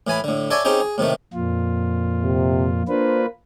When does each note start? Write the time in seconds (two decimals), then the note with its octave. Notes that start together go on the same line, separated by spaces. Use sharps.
0.07 A2 E3 G#5 B5
0.24 A2 D3
0.51 A4 C#5 D5 E5 G#5
0.65 C4 C#4 D#4 G4 G#4
0.80 G#4
0.98 A2 C3 D#3 A3
1.33 F2 A#2 F4
2.23 C3
2.88 A#3 D4 F4 B4 C5